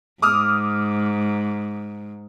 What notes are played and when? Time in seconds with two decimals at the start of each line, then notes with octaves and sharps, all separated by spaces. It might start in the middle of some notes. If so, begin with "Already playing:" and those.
0.22 G#2 D6 D#6 F6